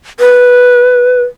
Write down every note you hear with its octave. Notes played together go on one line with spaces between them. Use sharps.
B4